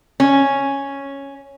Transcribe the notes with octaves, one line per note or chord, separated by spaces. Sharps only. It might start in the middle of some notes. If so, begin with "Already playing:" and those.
C#4